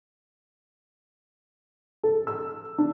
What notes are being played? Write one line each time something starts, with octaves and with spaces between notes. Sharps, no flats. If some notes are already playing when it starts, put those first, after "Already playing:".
A4
E6
D4